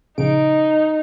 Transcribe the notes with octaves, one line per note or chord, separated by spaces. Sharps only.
A#1 C#3 D#4 D7